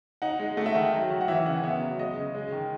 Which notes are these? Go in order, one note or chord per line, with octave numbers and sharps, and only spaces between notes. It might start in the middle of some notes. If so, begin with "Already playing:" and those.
D#4 F#5
G#3
A3 F#5
E5
D#3 F#5
F#3
D#3
F#5
E3 E5
E5
C#3 F#5
B3 E5
F#3
G#3 D#5
C#3
G#3
D#3